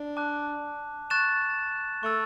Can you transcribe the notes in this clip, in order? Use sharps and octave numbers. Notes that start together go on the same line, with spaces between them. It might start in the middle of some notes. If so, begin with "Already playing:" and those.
Already playing: D4
A5 D6 F#6
C#6 F#6 A6 E7
A3 C#6 E6 A6